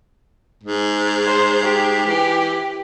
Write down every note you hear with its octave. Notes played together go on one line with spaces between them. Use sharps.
G#2
C5
G4
E3